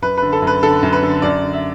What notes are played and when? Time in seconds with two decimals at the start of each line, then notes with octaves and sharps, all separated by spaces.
0.02 F#2 B4
0.17 D3 B4
0.32 A4
0.42 F#2
0.47 B4
0.63 D3 A4
0.83 F#2
0.93 B4
1.03 D3
1.22 F#2 D5
1.43 D3
1.53 E5